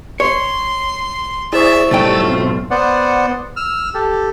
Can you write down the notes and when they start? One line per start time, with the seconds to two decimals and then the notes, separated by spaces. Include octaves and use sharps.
0.20 C#5 C6
1.53 E4 G#4 C5 D5 E5 C#6
1.91 B1 G#2 G3 A3 G5 E6 A6
2.23 B2 C4 F4
2.71 B3 C5 D5 F#5
3.56 E6 F6
3.94 G4 A4